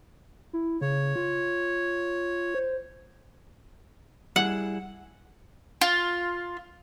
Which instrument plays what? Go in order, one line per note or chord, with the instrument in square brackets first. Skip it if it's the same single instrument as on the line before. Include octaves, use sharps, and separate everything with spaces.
[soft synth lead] E4
[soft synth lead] C#3 [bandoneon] C#5
[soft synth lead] F4
C5
[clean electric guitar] G3 E4 G#4 [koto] F#5
[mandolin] F4